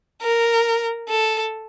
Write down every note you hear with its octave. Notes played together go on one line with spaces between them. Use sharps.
A#4
A4